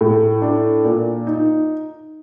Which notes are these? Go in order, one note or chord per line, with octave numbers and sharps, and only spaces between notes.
A2
D4
A#2
D#4